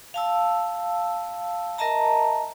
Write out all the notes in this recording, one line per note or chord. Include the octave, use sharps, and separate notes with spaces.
F5 A5 E6
A#4 D#5 E5 A5 A#5